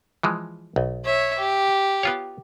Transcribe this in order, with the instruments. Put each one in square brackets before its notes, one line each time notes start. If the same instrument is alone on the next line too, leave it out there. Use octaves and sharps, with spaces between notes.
[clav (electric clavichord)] E3 F3 G#3
B1
[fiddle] C#5 E5
G4
[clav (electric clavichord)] B3 F4 C#5